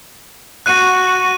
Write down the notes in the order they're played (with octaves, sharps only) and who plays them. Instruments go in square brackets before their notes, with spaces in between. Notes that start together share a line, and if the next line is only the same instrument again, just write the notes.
[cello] F#4 [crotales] F#6 D#7